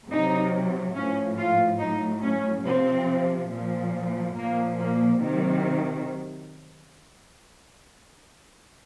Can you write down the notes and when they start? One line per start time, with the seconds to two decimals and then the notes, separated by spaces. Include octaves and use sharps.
0.10 C3 F#3 D#4
0.95 A2 F3 C#4
1.38 F4
1.80 A2 F#3 D#4
2.23 C#4
2.65 C3 F3 C4
3.50 A#2 F3
4.35 A#2 F3 A#3
4.78 A#3
5.20 C3 D#3 F#3